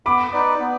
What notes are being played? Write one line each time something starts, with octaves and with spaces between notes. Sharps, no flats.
B3 B5 D6
D#4 B4 D5
B3